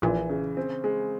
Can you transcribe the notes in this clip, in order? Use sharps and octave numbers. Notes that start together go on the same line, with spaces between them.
A#1 A#2 E3
C#3
C4
G#3